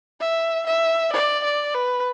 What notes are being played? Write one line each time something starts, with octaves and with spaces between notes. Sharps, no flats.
E5
E5
D5
D5
B4